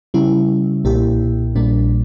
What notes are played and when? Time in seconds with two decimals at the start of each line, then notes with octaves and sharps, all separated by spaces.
0.14 C#3 G3 C#4 E4
0.84 B1 A#2 A#3 E4 G4
1.56 A#1 A#2 G3 A#3 D4